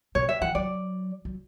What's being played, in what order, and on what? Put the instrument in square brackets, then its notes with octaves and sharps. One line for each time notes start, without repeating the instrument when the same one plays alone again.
[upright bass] B2 [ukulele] C#5
[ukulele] E5
[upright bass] E3 [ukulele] F#5
[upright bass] F#3 [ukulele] D5
[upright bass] F#3